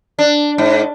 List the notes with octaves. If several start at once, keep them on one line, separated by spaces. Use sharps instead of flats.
D4
G#2